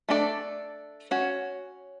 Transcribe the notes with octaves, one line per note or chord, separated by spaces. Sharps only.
A3 D4 A4 D5
C#4 F#4 C#5